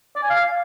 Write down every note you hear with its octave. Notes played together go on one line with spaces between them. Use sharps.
D5
G#5
F5